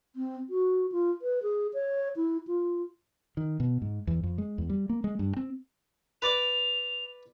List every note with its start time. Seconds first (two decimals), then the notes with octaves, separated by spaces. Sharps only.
0.16 C4
0.50 F#4
0.92 F4
1.22 B4
1.43 G#4
1.74 C#5
2.16 E4
2.47 F4
3.37 D#3
3.60 B2
3.82 G#2
4.07 E2
4.23 F2
4.38 G#3
4.58 E2
4.69 G3
4.89 A#3
5.04 G#3
5.19 G2
5.37 C4
6.22 B4 D5 D6 F7